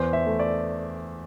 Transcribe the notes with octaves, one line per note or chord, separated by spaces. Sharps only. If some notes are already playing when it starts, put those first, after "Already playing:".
Already playing: E2 C5
E5
A3
D5